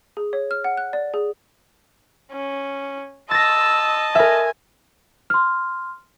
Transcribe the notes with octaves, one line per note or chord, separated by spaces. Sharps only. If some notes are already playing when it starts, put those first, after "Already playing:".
G#4
C#5
F6
F#5
F#6
D5
G#4
C#4
D#5 A5 E6 A6 A#6
A#4 E5 G#5
C6 F6